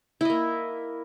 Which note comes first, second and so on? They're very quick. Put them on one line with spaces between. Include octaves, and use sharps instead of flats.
E4 D#5 A#3